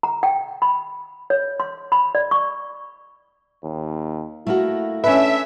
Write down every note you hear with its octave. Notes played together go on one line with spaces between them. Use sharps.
A#5
G5
B5
C#5
C6
B5
D5
C#6
D#2
A3 A#3 E4 F#4
C#4 D4 A4 B4 E5